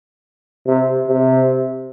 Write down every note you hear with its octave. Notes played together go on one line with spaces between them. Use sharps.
C3
C3